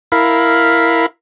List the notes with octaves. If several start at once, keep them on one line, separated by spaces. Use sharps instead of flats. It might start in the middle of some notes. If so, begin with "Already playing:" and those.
E4 A#4 F5 B5